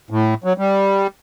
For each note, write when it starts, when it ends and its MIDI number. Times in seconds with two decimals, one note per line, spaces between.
0.10 0.34 45
0.44 0.53 54
0.58 1.07 55